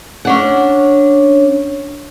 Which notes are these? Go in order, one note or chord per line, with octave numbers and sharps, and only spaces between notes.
C#4 D4 F#5